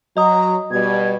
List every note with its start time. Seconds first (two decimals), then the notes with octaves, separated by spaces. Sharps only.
0.17 F#3 D#5 A#5 D#6
0.71 B2 G3 G#6